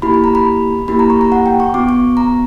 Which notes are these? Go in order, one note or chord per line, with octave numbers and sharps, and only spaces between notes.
A#3 E4 G4 B5
B5
A#5
B5
A#3 E4 G4 B5
A#5
C#6
A#5
F#5
G5
C#6
B3 F#4 D6
C#6
A#5